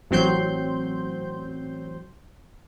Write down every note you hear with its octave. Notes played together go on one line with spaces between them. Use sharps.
A1 F#3 C4 C6 G6